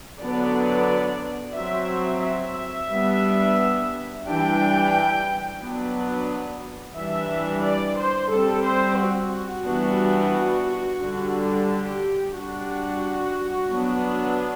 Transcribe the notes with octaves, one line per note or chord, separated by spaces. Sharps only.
D3 F#3 B3 D4 D5
F#3 C4 E5
E5
G3 B3 D4
E3 G3 D4 G5
F#3 B3 D4
E3 G3 D4 E5
D5
C5
G3 C4 A4
C5
F#4
E3 G3 B3 D4
D3 G3 D4
G4
G3 D4 F#4
F#3 B3 D4